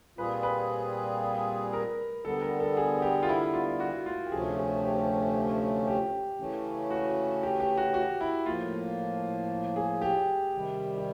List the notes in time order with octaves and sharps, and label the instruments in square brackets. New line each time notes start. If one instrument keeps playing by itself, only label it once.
[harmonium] A#2 G3 C4 F4 G#4 [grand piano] B4
[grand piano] B4
A#4
[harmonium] D3 G3 B3 [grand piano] A4
[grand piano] A#4
A4
G#4
G4
F4
E4
F4
F#4
F4
G4
[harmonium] D2 C3 F3 A3 C#4 [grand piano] G#4
[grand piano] G#4
G4
G4
[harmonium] C#3 E3 A3 C#4
[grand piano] F#4
G4
G4
F#4
F#4
E4
[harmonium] A2 F3 A#3 [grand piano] F4
[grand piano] G#4
G4
[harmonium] C3 D#3 G3
[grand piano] G4